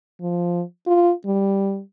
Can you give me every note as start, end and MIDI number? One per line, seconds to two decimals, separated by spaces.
0.21 0.62 53
0.87 1.12 65
1.26 1.81 55